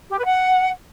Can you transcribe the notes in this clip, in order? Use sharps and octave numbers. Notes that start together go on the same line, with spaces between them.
G4
B4
F#5